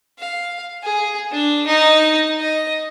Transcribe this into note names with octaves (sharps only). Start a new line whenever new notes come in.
F5
G#4
D4
D#4
D#5